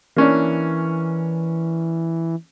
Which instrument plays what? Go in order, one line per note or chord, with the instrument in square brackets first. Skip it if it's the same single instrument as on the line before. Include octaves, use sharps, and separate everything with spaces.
[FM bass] E3 [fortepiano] A#3 C#4 D4